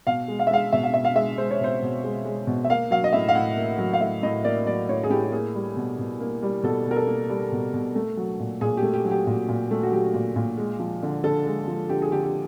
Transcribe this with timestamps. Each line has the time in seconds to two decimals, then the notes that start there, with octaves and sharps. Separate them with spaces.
0.07 B2 F5
0.28 G#3
0.39 F5
0.47 E5
0.50 G#3 F5
0.73 B2 E5
0.84 F5
0.94 B2 E5
1.05 F5
1.15 G#3 E5
1.38 G#3 C5
1.51 C#5
1.60 B2 C5
1.82 B2
2.04 G#3
2.25 G#3
2.47 B2
2.65 E5
2.70 A#3 F5
2.91 F#3 F5
3.04 D#5
3.13 A2 E5
3.28 F5
3.35 A2 F#5
3.57 A#3
3.79 F#3
3.93 F5
4.01 A2 E5
4.23 A2 D#5
4.44 A#3 D5
4.67 F#3 D5
4.89 A2 C#5
5.03 G#4
5.10 A2 G4
5.22 G4
5.32 A#3 G#4
5.55 G3
5.76 B2
5.99 B2
6.20 A#3
6.42 G3
6.63 B2 A4
6.86 B2
6.91 A#4
6.96 A4
7.07 A#3
7.29 G3
7.52 B2
7.73 B2
7.95 A3
8.17 F#3
8.40 A#2
8.61 A#2 G#4
8.77 A3 G4
8.94 G4
9.04 F#3
9.11 G4
9.27 A#2 F#4
9.48 A#2
9.71 A3
9.83 F#4
9.92 F#3 G4
10.14 A#2
10.36 A#2
10.58 G#3
10.79 F3
11.03 D3
11.24 D3 A4
11.45 G#3
11.68 F3
11.89 D3 G4
12.02 G#4
12.12 D3 G4
12.23 G4